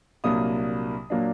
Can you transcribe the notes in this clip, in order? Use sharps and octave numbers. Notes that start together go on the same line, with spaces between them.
C2 A#2 F#3 A#3 D4 D#6
A#2 F#3 A#3 D4